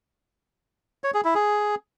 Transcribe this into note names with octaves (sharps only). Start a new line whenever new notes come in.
C#5
G#4
E4
G#4